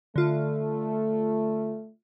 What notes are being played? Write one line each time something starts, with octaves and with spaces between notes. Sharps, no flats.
D3 A3 F4